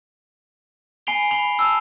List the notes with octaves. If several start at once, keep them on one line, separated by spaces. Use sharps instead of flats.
G#5 B5 C7 D7 F7 G7
B5 C7 F7 G7
A5 E6 F7